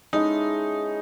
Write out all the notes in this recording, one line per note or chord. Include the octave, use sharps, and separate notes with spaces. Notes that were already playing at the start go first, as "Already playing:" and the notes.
G#3 C#4 D#4 E4 A4